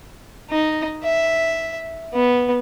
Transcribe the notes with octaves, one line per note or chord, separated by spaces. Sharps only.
D#4
E5
B3